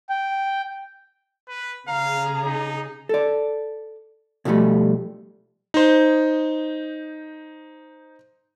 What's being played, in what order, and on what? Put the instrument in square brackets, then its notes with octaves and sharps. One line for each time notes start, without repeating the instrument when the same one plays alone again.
[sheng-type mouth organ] G5
[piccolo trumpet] B4
[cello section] C#3 G#4 [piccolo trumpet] F5 [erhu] A#5
[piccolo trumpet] D#4
[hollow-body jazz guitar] A4 D5
B2 D3 F3 G3 A3
[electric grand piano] D#4 C5